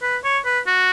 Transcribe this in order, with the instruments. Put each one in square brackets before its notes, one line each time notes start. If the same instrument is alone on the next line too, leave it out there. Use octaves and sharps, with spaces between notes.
[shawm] B4
C#5
B4
F#4